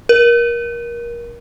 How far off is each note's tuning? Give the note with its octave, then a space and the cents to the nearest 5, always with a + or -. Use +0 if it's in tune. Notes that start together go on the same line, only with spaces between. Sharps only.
A#4 +25